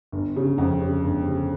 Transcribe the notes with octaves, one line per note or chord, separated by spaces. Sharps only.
G1
C#3
F2
C#3
G1
C#3